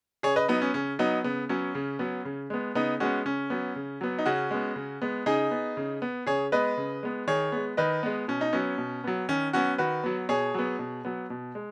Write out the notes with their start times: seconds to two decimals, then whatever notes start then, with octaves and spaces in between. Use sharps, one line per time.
0.23 C#3 G#4 C#5
0.36 B4 D#5
0.48 F#3 B3 D#4
0.62 C#4
0.74 C#3 C#4
0.99 F#3 B3 D#4
1.24 C#3 B3
1.49 F#3 B3 C#4
1.75 C#3
1.99 F#3 B3
2.25 C#3
2.50 G#3 B3
2.75 C#3 B3 D#4
3.00 G#3 B3 C#4 F#4
3.25 C#3 C#4
3.50 F#3 B3
3.76 C#3
4.01 F#3 B3
4.18 D#4
4.26 C#3 C#4 F#4
4.51 G#3 B3
4.76 C#3
5.02 G#3 B3
5.26 C#3 D#4 G#4
5.51 B3
5.77 C#3
6.02 B3
6.27 C#3 G#4 C#5
6.52 G#3 B3 B4 D#5
6.77 C#3
7.03 G#3 B3
7.27 D#3 G#4 C#5
7.52 G#3 B3
7.77 D#3 B4 D#5
8.03 G#3 B3
8.28 B2 C#4
8.41 D#4
8.53 F#3 B3 C#4
8.78 B2
9.04 F#3 B3
9.29 D#3 C#4
9.53 F#3 B3 C#4 F#4
9.78 D#3 F#4 B4
10.04 F#3 B3
10.29 B2 G#4 C#5
10.54 F#3 B3
10.79 B2
11.05 F#3 B3
11.30 B2
11.55 G#3